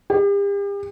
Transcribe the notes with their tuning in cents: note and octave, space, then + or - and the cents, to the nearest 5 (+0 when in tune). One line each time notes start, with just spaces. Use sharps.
G4 +40